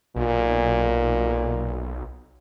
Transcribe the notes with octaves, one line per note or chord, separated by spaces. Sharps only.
B1 A#2